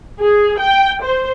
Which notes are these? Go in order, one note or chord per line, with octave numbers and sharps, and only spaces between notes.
G#4
G5
C5